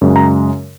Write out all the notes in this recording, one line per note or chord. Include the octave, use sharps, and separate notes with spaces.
F#2 C#3 G#3
A#5